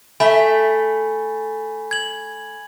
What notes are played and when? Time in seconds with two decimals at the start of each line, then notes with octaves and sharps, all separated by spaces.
0.20 A3 E5 G#5 B5
1.91 G#6 F#7